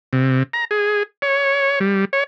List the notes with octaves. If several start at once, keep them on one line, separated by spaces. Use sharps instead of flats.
C3
A#5
G#4
C#5
G3
C#5